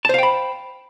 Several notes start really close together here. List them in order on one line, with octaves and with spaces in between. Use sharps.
A5 C5 F5 G5 B5